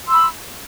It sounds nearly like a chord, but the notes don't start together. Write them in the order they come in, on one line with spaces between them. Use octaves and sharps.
C6 E6 B5